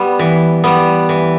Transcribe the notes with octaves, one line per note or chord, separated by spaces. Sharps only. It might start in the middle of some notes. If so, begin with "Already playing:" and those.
Already playing: G3 B3
E3
G3 B3
E3